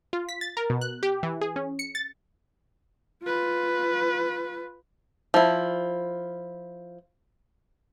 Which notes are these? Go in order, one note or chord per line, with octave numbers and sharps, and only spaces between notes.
F4
B6
A6
A#4
B2
F#6
G4
E3
G#4
C#4
C#7
A6
F4 B4
F3 E4